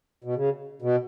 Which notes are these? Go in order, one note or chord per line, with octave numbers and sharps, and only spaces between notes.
B2
C#3
B2